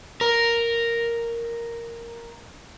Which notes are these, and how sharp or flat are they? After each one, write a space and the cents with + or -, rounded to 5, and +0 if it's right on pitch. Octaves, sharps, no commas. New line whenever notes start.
A#4 -5